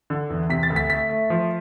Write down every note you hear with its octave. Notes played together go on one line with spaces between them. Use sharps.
D3
E2
C3 B6
A6
D2
B6
A3 B6
A3
F3